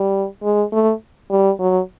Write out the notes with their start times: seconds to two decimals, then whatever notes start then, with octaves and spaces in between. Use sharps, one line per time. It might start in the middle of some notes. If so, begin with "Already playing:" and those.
Already playing: G3
0.43 G#3
0.72 A3
1.30 G3
1.59 F#3